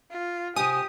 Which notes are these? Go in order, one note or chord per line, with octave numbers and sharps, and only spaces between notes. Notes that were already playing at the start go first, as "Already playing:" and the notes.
F4
C3 G4 G#5 D#6